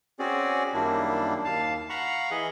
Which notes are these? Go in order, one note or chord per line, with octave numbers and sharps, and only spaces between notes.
C4 C#4 F#4 G#4 D5
F#2 D#3 G3 A#3 D4 E4
D#2 F5 A5
F5 F#5 A#5 B5 C#6
E3 G#4 D#5